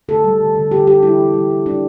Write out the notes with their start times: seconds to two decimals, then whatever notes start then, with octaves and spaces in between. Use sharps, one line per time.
0.08 D3 A4
0.24 G3
0.40 D3
0.55 D3
0.71 D3 G4
0.87 G3 G4
1.02 G3 E4
1.18 G3
1.34 G3
1.50 G3
1.66 G3 D4